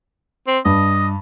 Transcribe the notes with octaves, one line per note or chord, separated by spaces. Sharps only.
C4
G2 D#5